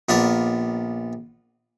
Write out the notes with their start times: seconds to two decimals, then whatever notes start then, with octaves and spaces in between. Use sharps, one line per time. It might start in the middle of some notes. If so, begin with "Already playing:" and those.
0.09 A#1 B3 F4 A#4 D5 A5